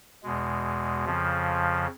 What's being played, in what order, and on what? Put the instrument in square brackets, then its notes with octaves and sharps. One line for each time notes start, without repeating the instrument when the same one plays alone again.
[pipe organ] E2 B2 G#3
F2 C#3 F3